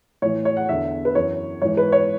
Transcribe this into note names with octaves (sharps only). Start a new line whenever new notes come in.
A2 E3 C#5
C#5
F#5
E2 D3 E5
B4
F#2 E3 C#5
G#2 E3 C#5
B4
C#5